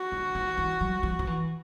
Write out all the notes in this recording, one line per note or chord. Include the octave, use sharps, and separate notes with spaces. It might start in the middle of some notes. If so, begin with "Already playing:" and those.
Already playing: F#4
D3
D#3
E3
F#3
F3
F3
E3